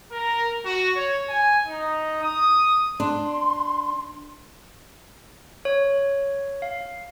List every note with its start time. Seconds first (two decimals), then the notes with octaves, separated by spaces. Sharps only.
0.12 A#4
0.65 F#4
0.95 C#5
1.30 G#5
1.66 D#4
2.23 D#6
3.00 D4 C6
5.65 C#5
6.62 F5